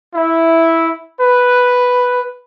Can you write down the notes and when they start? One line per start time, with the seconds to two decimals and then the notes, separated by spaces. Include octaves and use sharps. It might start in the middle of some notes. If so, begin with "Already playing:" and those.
0.14 E4
1.19 B4